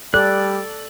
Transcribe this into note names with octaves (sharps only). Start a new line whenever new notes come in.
G3 A4 D5 F#6